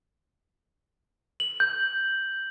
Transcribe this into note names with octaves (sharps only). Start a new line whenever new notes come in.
F#7
G6